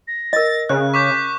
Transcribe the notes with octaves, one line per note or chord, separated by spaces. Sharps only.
A#6
A#4 D#5 A6
C#3 F#6
C#6 D6 G6 B6